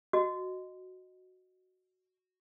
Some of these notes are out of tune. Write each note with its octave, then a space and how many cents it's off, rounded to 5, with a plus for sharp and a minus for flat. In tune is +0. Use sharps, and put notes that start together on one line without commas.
F#4 +0 D#5 -10